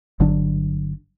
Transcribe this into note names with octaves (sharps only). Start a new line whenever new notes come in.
G1 D3 F#3 D4